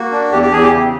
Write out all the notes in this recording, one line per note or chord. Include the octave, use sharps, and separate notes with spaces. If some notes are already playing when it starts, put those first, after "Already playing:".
Already playing: A#3 F#4
D4
E2 G4
G4
E2 G#4
G4
C#3